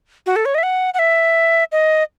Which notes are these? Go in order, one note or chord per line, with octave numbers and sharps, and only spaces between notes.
F#4
A4
C#5
D#5
E5
F#5
F#5
E5
D#5